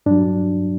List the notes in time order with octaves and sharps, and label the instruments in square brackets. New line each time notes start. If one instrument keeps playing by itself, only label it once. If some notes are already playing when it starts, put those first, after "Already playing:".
[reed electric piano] G2 F#3 D4